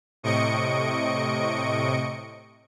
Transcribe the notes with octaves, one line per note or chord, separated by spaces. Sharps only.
A2 C3 D#5 C#6 C#7 D7